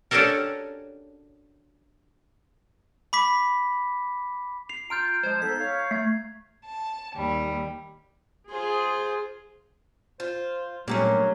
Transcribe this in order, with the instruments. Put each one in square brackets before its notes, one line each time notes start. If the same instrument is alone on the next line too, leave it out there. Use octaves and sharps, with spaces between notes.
[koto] C#4 D4 F#4 G4 A4 A#4
[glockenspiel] B5 D6 B6
C7 F7
[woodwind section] F4 [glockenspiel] A#5 F6 G6 [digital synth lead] D7
[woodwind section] F3 G#3 [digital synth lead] C5 [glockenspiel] G#6
[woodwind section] B3 D#4 A4 [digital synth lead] B6
[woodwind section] C#5 F5
[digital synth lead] A3 [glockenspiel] G#6 C7
[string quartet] A5
D#2 G3
[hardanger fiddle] F4 C5 [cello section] G#4
[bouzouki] F4 [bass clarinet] C5
[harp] G2 A3 C#5 [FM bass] A#2 [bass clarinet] F#3 [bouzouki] A#3 C4 C#4